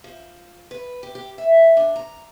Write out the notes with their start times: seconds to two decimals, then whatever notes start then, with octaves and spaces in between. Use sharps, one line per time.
0.04 F3
0.71 B4
1.03 G4
1.15 G4
1.38 E5
1.77 D4
1.96 A#5